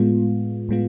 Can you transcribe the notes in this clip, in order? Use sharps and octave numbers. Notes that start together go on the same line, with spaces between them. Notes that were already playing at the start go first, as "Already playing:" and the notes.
Already playing: A2 G#3 B3 F4
A2 G#3 B3 F4